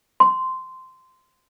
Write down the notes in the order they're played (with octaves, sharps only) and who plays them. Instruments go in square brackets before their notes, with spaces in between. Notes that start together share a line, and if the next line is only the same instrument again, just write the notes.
[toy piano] C6